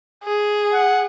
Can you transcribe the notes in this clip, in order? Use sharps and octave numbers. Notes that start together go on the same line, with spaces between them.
G#4
F#5